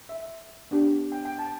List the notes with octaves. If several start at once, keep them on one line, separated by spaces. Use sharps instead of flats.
E5
B3 D4 G4
G5
G5
A5